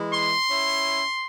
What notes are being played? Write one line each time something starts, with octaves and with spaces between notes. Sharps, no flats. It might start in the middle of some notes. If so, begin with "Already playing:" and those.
Already playing: E3 G#3 E4
C6
C#4 E4